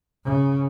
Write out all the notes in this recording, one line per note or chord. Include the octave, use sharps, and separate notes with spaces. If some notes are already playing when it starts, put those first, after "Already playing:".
C#3